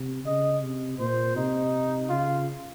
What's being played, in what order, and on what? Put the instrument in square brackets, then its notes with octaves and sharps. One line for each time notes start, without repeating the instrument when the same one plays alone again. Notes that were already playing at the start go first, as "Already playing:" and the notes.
Already playing: [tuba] C3
[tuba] C#3 [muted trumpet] D#5
[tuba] C3
[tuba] A#2 [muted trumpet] C5
[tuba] C3 [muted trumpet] D#4
[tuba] C#3 [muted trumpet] F4